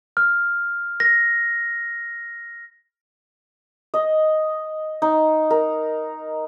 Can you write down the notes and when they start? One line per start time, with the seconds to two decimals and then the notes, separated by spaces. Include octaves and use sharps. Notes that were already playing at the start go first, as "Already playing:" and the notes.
0.17 F6
1.00 A#6
3.94 D#5
5.02 D#4
5.50 A#4